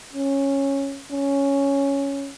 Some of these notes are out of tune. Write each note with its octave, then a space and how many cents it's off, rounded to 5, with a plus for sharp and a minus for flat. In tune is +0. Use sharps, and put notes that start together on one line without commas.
C#4 -10
C#4 +0